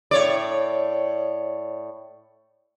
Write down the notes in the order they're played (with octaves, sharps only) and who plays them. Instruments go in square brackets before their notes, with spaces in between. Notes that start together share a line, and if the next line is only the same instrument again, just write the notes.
[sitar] A2 C#5 D5